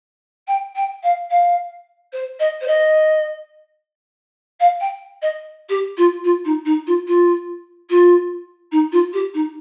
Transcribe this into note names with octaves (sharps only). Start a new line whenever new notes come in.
G5
G5
F5
F5
C5
D#5
C5
D#5
F5
G5
D#5
G4
F4
F4
D#4
D#4
F4
F4
F4
D#4
F4
G4
D#4